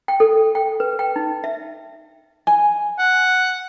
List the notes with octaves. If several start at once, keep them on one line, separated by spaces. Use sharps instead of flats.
G5
A4
G5
B4
G5
D#4
E5
G#5
F#5